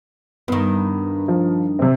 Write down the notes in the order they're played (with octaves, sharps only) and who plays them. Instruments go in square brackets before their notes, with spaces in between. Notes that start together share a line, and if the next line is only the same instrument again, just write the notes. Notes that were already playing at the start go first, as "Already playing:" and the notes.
[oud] G2 D#3 [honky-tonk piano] B3
[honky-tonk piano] F3
C3 C4